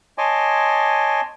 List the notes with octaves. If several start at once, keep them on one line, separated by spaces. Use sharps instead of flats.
C#5 D#5 G#5 A5 C6 D6